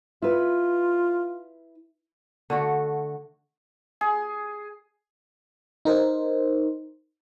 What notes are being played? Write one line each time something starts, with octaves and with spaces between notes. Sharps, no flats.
E4 F4 B4
D3 A3 F#4
G#4
D#4 A#4 C5